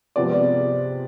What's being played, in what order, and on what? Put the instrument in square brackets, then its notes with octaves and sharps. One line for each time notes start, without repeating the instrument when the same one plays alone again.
[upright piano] C3 F3 G#3 B3 D5